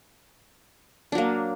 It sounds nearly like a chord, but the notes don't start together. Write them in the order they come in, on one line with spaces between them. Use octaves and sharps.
D4 F#3 A#3